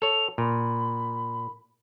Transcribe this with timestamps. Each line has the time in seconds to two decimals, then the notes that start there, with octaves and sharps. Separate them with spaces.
0.02 A4 C#5 F7
0.38 A#2 B5